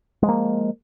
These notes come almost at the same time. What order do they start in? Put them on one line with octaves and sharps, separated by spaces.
G#3 F3 A#3